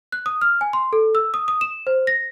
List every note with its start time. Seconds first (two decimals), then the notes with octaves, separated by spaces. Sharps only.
0.12 F#6
0.26 D#6
0.42 F6
0.61 G#5
0.73 C6
0.93 A4
1.15 E6
1.34 D#6
1.48 D#6
1.61 E7
1.87 C5
2.07 A#6